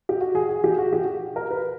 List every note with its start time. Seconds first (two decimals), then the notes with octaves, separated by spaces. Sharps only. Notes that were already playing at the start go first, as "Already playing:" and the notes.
0.09 G4
0.21 F#4
0.35 G#4
0.49 G#4
0.64 G4
0.78 F#4
0.93 G4
1.36 A#4
1.51 B4